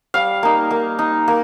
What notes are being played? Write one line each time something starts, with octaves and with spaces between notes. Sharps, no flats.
G3 F5
A#3 D#4
A#3
D#4
A#3